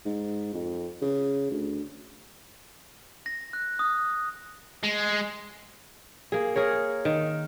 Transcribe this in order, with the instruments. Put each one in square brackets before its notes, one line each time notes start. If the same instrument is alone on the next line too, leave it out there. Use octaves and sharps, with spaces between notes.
[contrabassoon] G#2
F2
C#3
D2
[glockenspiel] A#6
F#6
D#6
[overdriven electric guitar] G#3
[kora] A#3 G#4
G#4 A#4 C#5
D#3